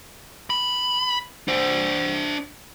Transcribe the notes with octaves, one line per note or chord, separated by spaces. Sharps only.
B5
D4 C5